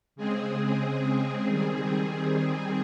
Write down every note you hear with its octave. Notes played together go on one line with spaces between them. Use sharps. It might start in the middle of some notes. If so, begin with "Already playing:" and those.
C#3 G#3 C4 G#4
D#3 G3 C4